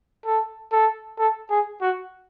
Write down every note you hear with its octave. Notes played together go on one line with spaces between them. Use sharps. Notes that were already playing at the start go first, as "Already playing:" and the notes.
A4
A4
A4
G#4
F#4